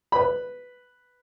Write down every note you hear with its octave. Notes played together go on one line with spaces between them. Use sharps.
B4 B5